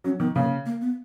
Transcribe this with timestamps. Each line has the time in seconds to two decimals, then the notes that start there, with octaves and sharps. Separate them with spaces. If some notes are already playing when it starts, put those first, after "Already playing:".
0.04 F#3 C#4
0.20 D#3 B3
0.36 C#3 A#3
0.66 A#3
0.81 B3